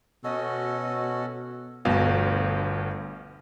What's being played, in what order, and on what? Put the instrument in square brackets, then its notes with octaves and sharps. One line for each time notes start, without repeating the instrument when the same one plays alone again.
[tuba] B2 [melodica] C#4 F#4 A4 [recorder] D#5
[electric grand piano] G1 D2 B2 F5